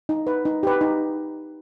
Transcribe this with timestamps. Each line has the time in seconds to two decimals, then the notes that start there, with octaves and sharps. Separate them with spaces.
0.09 D#4
0.27 B4
0.45 D#4
0.63 G4 B4
0.81 D#4